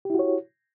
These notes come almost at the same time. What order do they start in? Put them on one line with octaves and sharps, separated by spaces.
G4 E4 F#4 C#5